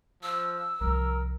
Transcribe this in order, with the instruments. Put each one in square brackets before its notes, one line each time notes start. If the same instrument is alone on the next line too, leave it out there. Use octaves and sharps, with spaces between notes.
[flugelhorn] F3 [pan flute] E6
[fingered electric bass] C2 F3 [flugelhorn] A#4